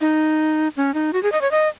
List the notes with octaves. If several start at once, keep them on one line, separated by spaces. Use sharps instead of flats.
D#4
C#4
D#4
F#4
G#4
D#5
C#5
D#5